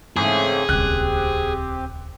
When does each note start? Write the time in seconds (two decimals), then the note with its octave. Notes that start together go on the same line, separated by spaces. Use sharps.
0.16 G#2 C#3 E3 A3 C4 G#4
0.69 D#1 C#2 C4 G4 F#6